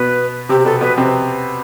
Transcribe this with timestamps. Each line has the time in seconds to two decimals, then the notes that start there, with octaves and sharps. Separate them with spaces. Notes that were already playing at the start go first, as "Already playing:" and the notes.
Already playing: B2 B3 B4
0.49 C3 C4 G4
0.60 G4
0.65 B2 B3 A4
0.81 B2 B3 B4
0.97 C3 C4